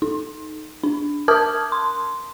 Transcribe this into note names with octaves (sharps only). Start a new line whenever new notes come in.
D#4
D4
A#4 A5 D6 D#6 F6 G#6
C6